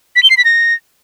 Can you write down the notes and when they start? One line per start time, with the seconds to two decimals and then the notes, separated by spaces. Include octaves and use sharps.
0.16 B6
0.23 G7
0.30 C7
0.37 B6
0.45 A#6